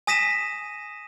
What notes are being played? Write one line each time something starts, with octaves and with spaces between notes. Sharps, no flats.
G#5 D#6 A#6 B6 D#7 E7